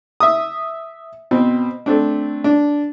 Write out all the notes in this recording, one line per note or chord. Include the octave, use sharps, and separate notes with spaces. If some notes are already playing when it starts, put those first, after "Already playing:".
E5 D#6
B2 C4
A3 C4 D4
D4